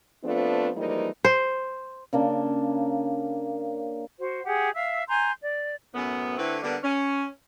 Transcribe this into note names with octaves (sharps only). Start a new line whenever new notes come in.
F3 A3 B3 C4 D4 F4
E3 F3 G3 G#3 A#3 D#4
C5
C#3 A#3 D4
F#4 C5
G4 G#4 F#5
E5 F5 E6
G#5 A#5 C6 G6
D5
F#2 A2 B3
D3 A3 C4 E4 B4
D3 G3 A#3 B3 D4
C#4